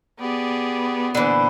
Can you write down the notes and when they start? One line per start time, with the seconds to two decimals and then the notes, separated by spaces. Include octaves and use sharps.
0.20 B3 G4 G#4 D5
1.15 A#2 D3 E3 D4 C5